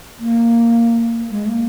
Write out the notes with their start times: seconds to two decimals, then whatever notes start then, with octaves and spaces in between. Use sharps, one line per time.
0.20 A#3
1.31 G#3
1.46 A3
1.49 A#3